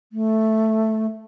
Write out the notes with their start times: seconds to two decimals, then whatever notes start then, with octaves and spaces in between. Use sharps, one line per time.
0.12 A3